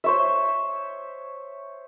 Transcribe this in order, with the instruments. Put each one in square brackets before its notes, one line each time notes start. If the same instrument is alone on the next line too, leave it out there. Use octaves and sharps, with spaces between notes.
[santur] C5 C#5 E5